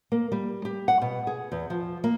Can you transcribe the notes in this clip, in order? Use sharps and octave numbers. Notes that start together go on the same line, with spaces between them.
A#3
G3
G4
F#5
B2
G#4
E2
F3
A#3